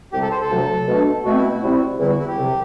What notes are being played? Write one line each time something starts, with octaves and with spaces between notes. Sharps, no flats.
C2 C3 G3 G4
A4
C5
A4
D2 C3 F#3
B2 A3 D4
B2 A3 C4 F#4
E4
F#4
C3 G3 C4 E4
E2 D3 G3 E4
F#4
E4
G4
C2 C3 F#3